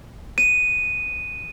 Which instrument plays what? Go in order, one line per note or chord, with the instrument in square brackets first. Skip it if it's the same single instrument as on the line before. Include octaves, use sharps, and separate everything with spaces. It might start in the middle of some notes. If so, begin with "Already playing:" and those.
[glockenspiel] D#7